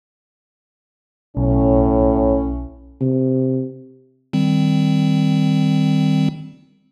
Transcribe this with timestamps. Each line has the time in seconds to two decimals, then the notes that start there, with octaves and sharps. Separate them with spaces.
1.37 B1 A2 C#4
3.01 C3
4.33 D#3 G3 C4